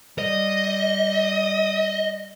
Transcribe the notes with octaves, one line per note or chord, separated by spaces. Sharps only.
G3 D#5